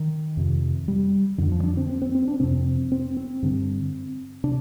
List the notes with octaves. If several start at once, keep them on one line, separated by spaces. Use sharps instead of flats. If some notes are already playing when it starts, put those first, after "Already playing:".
Already playing: D#3
F2 C3
G3
F2 D3 D#3
F3
D4
C4
C4
C4
C4
D4
F2 C3 C4
C4
C4
G2 D3
C3 D4